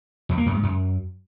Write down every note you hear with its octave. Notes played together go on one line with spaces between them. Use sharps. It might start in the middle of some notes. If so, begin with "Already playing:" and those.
F2
A#3
F#2
G#2
F#2